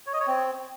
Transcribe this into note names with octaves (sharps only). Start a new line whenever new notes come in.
C#5
D#5
C#5
C4